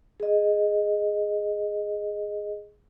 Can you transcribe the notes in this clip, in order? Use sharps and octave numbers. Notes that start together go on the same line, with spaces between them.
G#4 D#5